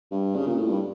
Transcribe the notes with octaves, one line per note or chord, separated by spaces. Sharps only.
G2
C#3
A#2
A2
G2